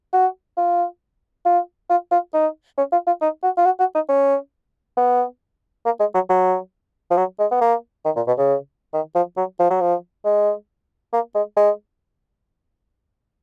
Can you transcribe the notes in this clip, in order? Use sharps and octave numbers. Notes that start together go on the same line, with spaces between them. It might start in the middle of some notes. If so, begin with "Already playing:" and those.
F#4
F4
F4
F4
F4
D#4
C#4
F4
F4
D#4
F#4
F4
F#4
F#4
D#4
C#4
B3
A#3
G#3
F#3
F#3
F3
F#3
G#3
B3
A#3
D#3
A#2
B2
C#3
D#3
F3
F#3
F3
F#3
F3
G#3
A#3
G#3
G#3